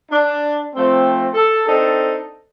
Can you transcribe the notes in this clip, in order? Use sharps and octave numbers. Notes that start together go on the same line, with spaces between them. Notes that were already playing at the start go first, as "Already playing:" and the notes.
D4
F3 A3 C4
A4
C4 D4 D#4 A4